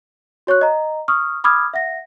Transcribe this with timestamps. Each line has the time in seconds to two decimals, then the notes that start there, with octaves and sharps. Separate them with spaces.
0.47 F#4 C#5 C#6 F#6
0.61 D#5 A#5
1.08 C#6 D#6 F6
1.44 B5 D6 D#6 F6 G#6
1.74 E5 F#5 A#6